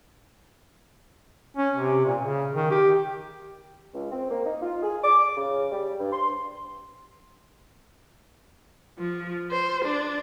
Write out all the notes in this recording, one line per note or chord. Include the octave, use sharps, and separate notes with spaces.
C#4
C3
A#2
C#3
D#3
G4
C#2
C4
A#3
D#4
F4
G#4
D6
C#3
G3
G2
C6
F3
C5
D4